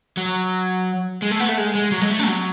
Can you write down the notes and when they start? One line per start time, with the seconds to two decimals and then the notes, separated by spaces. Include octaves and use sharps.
0.17 F#3
1.22 G#3
1.31 A3
1.40 B3
1.49 A3
1.57 G#3
1.75 G#3
1.92 F#3
2.01 G#3
2.10 A3
2.19 D4
2.27 F#3